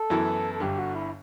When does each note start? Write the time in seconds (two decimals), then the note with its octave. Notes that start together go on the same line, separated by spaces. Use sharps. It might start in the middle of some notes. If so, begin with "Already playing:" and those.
Already playing: A4
0.10 F#2 E3 B3 E4
0.54 A4
0.60 G1 G2 D3 G4
0.76 F#4
0.94 E4